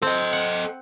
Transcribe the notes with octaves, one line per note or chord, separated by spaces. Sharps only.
C4 A4 D#5
F#5